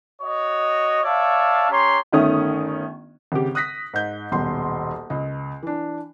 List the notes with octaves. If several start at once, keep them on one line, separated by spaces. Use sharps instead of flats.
F#4 C#5 D#5
C#5 D5 E5 F5 A5
C#4 G4 C#5 A#5 C6
G1 D#3 A3 C#4 D#6
G#1 C#3 G4
D#6 F#6 A#6 B6
G#2 G6
D#1 B1 C6
C#2 D#5
E3 D4